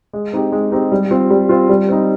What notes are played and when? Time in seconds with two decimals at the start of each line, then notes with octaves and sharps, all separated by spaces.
0.13 G#3
0.33 C4 D#4 G4
0.52 G#3
0.72 C4 D#4 G4
0.92 G3
1.11 C4 F4
1.30 G3
1.49 C4 F4
1.69 G3
1.89 C4 D#4